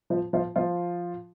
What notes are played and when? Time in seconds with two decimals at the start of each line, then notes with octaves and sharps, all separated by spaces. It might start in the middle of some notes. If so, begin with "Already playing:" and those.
0.10 F3 F4
0.33 F3 F4
0.56 F3 F4